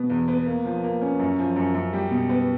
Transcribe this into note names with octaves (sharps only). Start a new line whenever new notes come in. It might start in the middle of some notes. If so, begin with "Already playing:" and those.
Already playing: B2 B3
E2
B3
A#3
F3
A#3
C#4
F#2
F3
F#2
F#2
G3
B2
B3